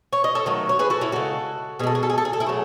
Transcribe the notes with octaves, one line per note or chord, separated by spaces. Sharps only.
C#5
D#5
A4 C#5
D#3 F#3 A3
C#5
G#4 B4
F#4 A4
C#4 E4
C#3 G#3 F#4 A4
B2 G#3 G#4 A4
G#4
A4
G#4
A4
G#4
A4
E4 G#4
F#3 A3